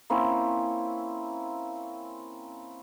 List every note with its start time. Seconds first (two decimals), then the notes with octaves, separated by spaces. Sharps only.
0.10 A#3 C4 C#4 E4